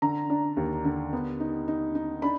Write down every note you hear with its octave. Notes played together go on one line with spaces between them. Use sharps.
D3 A#5
D4
D#2
D3
B3
D#4
D#4
D#4
D4 B5